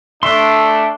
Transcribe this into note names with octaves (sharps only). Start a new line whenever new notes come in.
A3 D4 E5 C6